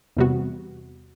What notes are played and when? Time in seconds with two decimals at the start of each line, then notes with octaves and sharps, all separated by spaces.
0.17 E2 C3 G3 B3 F#4